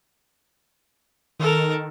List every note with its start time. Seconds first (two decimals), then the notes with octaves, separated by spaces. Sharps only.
1.40 D#3 A4 A#4